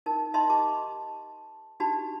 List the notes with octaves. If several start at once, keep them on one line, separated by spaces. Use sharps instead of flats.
D#4 A#4 A5
D#4 D#5 E5 A5 B5 C6
G4 A5 D6
D4 D#4 F#4 G4 A5 B5